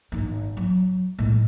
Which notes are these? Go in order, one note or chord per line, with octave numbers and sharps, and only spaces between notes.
G#1 D#4
F#3
A2 G#3